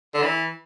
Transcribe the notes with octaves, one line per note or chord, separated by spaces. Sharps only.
D3
E3